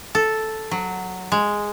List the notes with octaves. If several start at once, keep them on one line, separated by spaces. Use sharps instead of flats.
A4
F#3
G#3